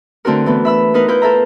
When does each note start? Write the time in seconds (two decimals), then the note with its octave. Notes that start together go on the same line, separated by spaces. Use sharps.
0.25 D3 A3 C4 D4 F#4 A#4
0.46 E3 A3 B3
0.65 E5 B5 E6
0.94 B3 D#4 A#4 B4
1.08 E4 F4 B4 G6
1.22 F4 A4 A#4 E5 A#5